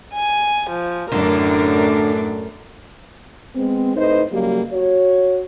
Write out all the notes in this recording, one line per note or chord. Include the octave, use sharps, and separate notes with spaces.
G#5
F3
F#2 A2 D3 D4 A#4
G#3 B3 C4
A2 D#4 B4 C5 D#5
C#3 F#3 G3 A#3 G4
F#4 C#5